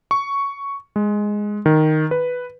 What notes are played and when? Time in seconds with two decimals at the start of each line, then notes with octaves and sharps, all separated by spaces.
0.11 C#6
0.96 G#3
1.66 D#3
2.11 B4